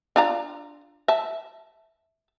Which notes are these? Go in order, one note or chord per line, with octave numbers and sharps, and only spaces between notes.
D4 F4 A#5
E5 A5